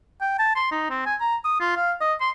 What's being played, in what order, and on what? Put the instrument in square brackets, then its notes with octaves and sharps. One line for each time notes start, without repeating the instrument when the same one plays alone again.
[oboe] G5
A5
C6
D#4
C4
G#5
A#5
D#6
F4
F5
D#5
C6